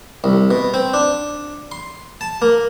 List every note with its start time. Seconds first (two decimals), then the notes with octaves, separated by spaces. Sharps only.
0.24 C2
0.51 B2
0.74 C4
0.94 D4
1.72 C6
2.21 A5
2.42 A#3